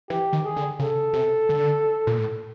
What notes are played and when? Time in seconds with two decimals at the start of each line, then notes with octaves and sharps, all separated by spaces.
0.10 E3 G4
0.33 D#3
0.45 G#4
0.56 D3
0.79 C#3 A4
1.13 C3
1.49 D3
2.07 A#2
2.18 A2